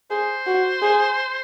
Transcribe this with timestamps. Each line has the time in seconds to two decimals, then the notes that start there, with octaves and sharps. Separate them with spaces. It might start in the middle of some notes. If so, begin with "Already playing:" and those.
0.11 G#4 C5
0.46 F#4
0.82 G#4